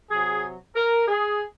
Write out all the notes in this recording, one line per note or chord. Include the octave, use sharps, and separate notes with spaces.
C3 F#3 G#4
A#4
G#4